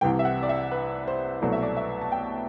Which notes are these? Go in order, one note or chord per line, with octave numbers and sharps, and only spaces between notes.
C2 C3 E3 G3 G5
E5
F#5
D5
E5
B4
C5
C2 B2 F#3 A3 D5
E5
D5
E5
A5
G5